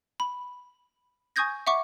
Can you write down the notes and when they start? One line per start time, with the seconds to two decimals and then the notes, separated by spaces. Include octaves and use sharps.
0.20 B5
1.36 G#5 C#6 D#6 G6 G#6 A#6
1.67 E5 F#5 C#6 D6